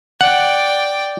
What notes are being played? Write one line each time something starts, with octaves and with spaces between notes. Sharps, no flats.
D5 F#5 G5